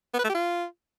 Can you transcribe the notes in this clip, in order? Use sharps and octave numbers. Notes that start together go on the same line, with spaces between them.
B3
B4
A3
G4
F4